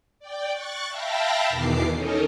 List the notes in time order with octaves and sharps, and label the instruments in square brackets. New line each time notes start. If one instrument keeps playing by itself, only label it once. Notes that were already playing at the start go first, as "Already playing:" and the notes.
[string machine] D5 G5
C#6 F#6 A6
E5 F5 G5 A5 B5 A#6
E2 B2 D#3 E3 D6 C7
C#4 D#4 A4 A#4 D#5